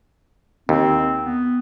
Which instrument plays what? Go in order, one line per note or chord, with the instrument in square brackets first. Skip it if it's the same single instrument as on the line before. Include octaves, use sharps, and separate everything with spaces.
[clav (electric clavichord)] D#2 [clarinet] C4
[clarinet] B3